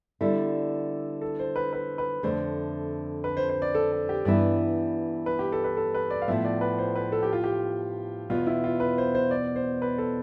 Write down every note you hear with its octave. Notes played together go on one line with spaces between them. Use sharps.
D3 G3 B3 E4 A4
A4
C5
B4
B4
B4
F2 D3 A3 C5
B4
C5
C5
D5
A4
A4
G4
G2 E3 B3 E4 D5
B4
G4
A4
B4
A4
B4
D5
F5
A2 F3 B3 E5
D5
B4
C5
B4
A4
G4
F4
G4
E2 B2 B3 F4
E4
F4
B4
C5
C5
D5
C5
B4
A4